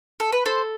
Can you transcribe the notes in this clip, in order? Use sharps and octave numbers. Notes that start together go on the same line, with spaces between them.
A4
B4
A4 C5